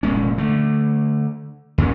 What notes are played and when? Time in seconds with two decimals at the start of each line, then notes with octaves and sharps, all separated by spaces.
0.03 F1 A#2 G#3 C#4
0.38 D3 A3
1.78 D#2 A#2 G#3 C#4